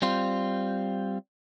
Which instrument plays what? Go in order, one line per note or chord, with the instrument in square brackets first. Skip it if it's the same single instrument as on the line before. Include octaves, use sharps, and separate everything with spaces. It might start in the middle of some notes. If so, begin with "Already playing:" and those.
[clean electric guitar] G3 C4 F4